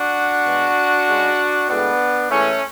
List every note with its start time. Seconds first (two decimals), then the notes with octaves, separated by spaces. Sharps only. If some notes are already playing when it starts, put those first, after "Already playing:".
Already playing: D4 F#4
0.44 B2 G#3
1.07 C#3 G#3
1.68 A2 G#3 B3 D4
2.29 A2 E3 G#3 A3 C#4